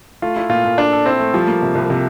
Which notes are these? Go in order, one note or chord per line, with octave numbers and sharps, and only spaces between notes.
A3 F4
E4
A#2 F4
A#2
D4 A4
A4
C4 E4
A3
F3 G3
A#3
C3
C2
C3